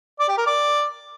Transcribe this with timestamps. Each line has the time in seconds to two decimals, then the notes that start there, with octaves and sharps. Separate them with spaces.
0.20 D5
0.29 G4
0.38 A#4
0.46 D5